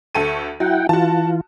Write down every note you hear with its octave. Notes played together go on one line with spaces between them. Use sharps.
D2 A4 C#6 D#7
F#3 E4 F#5 G5
E3 F4 F#4 A5